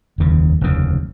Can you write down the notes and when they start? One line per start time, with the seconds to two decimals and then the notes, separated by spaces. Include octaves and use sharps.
0.18 F1 D#2 C#3
0.61 F1 D#2 C#3